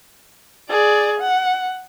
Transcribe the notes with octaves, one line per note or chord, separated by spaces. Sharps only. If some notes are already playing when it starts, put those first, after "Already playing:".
G#4 D5
F#5